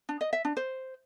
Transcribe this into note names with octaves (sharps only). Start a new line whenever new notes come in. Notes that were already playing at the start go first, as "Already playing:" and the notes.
D4
D#5
E5
D4
C5